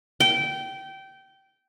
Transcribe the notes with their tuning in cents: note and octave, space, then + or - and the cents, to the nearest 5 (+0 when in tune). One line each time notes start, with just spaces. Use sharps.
G5 -20